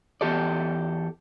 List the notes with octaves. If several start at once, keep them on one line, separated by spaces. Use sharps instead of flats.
E2 G4 A4 D5